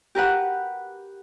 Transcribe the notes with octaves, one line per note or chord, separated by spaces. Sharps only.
G4 A#4 B4 F#5